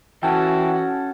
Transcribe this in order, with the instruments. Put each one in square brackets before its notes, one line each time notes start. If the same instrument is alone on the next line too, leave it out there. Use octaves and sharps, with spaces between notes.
[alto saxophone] E3 [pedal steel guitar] C#4 A4 [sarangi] F#4 [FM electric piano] G5 A5